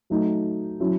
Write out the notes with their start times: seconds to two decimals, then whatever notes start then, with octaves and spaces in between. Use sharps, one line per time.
0.10 F#3 A3 D#4
0.80 F#3 C#4 E4